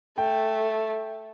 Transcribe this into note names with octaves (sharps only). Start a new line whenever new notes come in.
A3 G5